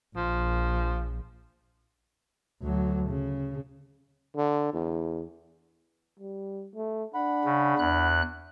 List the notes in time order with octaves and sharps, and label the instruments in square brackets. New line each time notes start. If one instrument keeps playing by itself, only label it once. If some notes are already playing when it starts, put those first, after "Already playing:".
[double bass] A#1 [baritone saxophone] F3
[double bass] D2 F#3
C#3
[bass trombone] D3
E2
[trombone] G3
A3
[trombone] D4 [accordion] F#5 B5
[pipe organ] C#3
E2 F#6